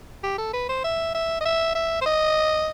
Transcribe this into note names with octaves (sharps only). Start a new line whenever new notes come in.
G4
A4
B4
C5
E5
E5
D#5
E5
E5
C5
D#5